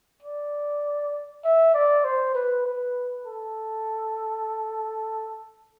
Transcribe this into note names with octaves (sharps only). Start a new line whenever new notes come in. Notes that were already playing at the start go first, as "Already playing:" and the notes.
D5
E5
D5
C5
B4
B4
A4